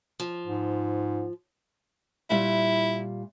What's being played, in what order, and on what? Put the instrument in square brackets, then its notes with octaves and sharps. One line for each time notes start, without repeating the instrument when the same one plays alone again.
[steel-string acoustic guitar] F3
[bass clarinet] G#2
[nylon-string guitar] A#2 G3 E5 [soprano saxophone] E4